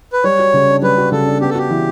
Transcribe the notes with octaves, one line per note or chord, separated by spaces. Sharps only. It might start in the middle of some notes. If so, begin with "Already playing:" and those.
B4
G3 C#5
F#4
C#3
D4
G3 B4
F#4
C#3 A4
D4
B3 G4
A4
F#4 G4
E3